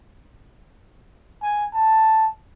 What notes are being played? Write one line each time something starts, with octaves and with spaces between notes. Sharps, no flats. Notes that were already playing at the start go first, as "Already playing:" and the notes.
G#5
A5